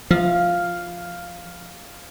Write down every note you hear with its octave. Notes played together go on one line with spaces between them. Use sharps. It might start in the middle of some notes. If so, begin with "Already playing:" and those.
F3 F5